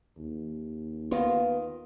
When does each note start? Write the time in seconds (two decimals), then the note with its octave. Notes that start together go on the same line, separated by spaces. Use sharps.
0.17 D#2
1.11 D#3 B3 F4